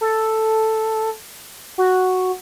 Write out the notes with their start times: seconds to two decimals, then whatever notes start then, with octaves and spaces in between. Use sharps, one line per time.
0.01 A4
1.78 F#4